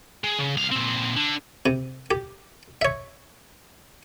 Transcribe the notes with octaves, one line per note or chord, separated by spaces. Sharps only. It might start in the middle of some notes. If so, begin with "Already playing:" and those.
G#3
C#3
C2 F5
A#2 C4
D3
C3
G4
C#5 E5